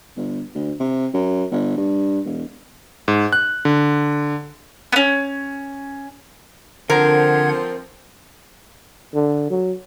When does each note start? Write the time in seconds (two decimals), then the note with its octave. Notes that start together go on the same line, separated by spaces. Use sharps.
0.17 G1
0.55 D2
0.80 C3
1.14 F#2
1.51 G1
1.77 G2
2.25 E1
3.08 G#2
3.33 F#6
3.65 D3
4.92 B3 C#4
6.90 D3 F3 C4 A#4 F#5 G#6
9.14 D3
9.50 F#3